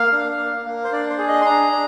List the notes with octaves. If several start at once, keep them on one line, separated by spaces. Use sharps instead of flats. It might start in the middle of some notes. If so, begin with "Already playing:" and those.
Already playing: A#3 F5
D4
A#3
A#3
C5
D4 D5
C5
G#4
D#5
C6
D4 A#5
D4